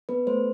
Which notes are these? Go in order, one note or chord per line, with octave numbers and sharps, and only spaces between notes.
B3 B4
A3 C5